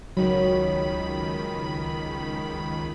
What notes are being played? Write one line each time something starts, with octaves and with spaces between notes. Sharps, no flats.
C#2 D#3 F#3 B5